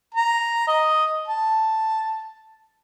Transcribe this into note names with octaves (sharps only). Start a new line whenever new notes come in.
A#5
D#5
A5